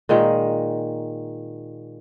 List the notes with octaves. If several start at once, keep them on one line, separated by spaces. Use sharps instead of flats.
A#2 D#3 G#3